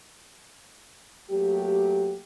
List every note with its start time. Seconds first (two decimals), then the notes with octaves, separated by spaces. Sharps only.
1.30 F#3 A3 A#3 G4